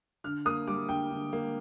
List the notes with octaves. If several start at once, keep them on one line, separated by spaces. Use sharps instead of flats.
D3 F6
A#3 D#6
G3 D6
D3 G5
D3
A#3